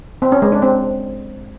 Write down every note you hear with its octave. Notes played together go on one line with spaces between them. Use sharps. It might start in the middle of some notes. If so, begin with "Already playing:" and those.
C4
C#4
G#3
D4
C4